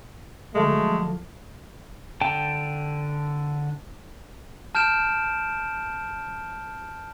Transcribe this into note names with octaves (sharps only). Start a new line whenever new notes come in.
D3 F3 F#3 G#3 A3
D3 G5 A5
A5 F6 G6 D7 E7